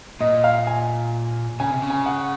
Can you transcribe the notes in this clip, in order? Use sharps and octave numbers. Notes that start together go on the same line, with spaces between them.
A#2 D#5
F5
G#5
C#3 G#5
C3
C#3
G#5
F#5